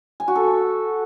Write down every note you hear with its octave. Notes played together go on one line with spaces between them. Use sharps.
G#5
F#4
A4